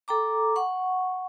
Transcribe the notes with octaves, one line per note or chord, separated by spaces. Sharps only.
A4 G5 A#5 D6
F#5 C#6